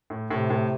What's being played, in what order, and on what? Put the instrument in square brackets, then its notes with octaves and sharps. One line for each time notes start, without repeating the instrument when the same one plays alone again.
[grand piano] A2
[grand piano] A2 [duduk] C3
[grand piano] A2